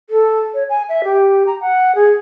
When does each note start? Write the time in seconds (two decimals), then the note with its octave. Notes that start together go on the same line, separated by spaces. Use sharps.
0.10 A4
0.54 C#5
0.69 G#5
0.89 E5
1.04 G4
1.47 A#5
1.61 F#5
1.95 G#4